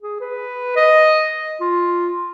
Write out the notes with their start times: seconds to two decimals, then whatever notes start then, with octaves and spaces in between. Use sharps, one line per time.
0.03 G#4
0.20 B4
0.76 D#5
1.61 F4